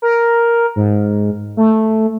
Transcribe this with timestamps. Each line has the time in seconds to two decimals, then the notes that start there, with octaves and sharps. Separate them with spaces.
0.02 A#4
0.76 G#2
1.57 A3